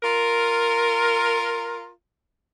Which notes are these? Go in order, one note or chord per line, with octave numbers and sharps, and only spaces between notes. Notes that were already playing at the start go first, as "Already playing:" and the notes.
F4 A#4